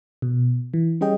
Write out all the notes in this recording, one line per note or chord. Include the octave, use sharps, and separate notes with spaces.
B2
E3
G3 C#4 G#4 D#5 G5